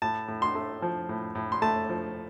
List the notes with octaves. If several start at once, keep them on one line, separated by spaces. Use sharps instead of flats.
A2 A5
A2
C6
A3
F3
A2
A2
C6
A3 A5
F3